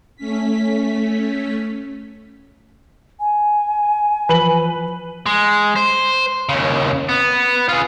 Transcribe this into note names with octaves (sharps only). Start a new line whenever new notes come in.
A3 C#4 B6
G#5
E3 F3 B4 F#7
G#3
C5
D#2 C#3
B3
F4 G#4